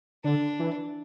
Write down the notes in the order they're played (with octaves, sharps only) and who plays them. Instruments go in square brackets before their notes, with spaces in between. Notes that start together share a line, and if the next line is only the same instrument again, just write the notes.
[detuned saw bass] D3 [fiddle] D4
[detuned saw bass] E3